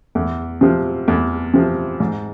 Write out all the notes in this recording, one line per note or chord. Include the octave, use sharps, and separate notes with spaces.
E2
C3 F3
E2
C3 F3
G#2